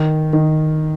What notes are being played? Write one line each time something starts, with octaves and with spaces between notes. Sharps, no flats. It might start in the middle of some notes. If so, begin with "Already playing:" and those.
Already playing: D#3
D#3